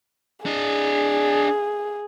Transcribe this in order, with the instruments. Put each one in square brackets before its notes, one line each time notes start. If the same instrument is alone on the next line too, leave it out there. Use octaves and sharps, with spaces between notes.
[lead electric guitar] D4 D#5 [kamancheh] G#4